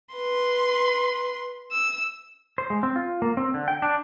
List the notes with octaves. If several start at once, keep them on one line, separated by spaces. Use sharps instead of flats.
B4 C6
E6
C5
G#3
C4
F4
A#3
C4
D3
G5
D4